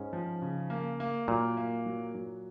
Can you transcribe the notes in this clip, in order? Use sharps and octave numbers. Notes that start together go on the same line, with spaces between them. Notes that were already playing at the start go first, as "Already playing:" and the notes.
Already playing: G#2 C#4
F3
C#3
A#3
A#3
A#2 F#3
A#3
F#3
F#3